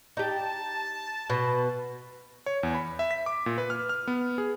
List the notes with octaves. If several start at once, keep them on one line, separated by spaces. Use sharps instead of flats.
D#4 G4 A5
B2
C#5
E2
B5
E5
B6
D6
A#2
B4
F6
F6
B3
G#4